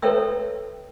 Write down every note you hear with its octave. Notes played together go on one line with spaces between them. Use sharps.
A4 B4 C#5 E5 G5 E6